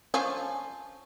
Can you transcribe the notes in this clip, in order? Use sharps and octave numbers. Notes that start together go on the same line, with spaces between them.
F3 C#4 D4